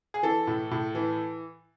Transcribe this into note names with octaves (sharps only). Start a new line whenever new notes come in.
G#4
E3 A4
A2
A2
E3